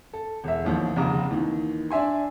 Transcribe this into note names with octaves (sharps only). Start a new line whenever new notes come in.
A4
E1 E5
A1 D#2 F3
F1 A#1 D#2 C#3 A#5 D6
D#2 D#3 E3
D4 D5 E5 G#5 C6